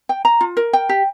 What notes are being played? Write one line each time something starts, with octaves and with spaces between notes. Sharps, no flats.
G5
A#5
F4
A#4
G5
G4